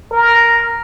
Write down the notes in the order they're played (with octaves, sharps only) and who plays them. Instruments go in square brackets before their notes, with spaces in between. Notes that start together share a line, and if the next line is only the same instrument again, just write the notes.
[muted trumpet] A#4